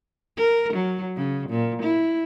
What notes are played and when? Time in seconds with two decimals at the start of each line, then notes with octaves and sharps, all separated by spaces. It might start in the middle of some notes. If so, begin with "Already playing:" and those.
0.37 A#4
0.74 F#3
1.16 C#3
1.49 A#2
1.82 E4